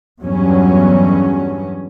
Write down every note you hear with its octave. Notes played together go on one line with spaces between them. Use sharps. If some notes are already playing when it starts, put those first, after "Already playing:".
E2 G2 F#3 C#4